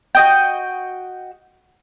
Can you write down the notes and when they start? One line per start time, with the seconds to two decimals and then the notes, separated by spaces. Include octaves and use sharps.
0.15 F#4 D#5 G5